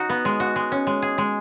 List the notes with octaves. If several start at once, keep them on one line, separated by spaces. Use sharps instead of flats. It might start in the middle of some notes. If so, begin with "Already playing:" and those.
Already playing: D#4 F#4
B3
G#3
F#4
G#3
C#4
G#3
G#4
G#3